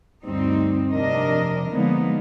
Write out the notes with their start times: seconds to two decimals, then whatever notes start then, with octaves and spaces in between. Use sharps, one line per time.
0.25 D2 G2 G3 C4 D#4
0.91 F2 C3 D4 A#4 D#5
1.71 D3 F3 G#3 A#3 B3 D#4